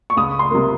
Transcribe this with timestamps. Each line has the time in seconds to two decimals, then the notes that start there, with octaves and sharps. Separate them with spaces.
0.10 C#6
0.17 C#2 D#6
0.39 C6
0.51 C3 G3 A#3